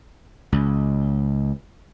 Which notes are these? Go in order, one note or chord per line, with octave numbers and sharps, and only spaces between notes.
C#2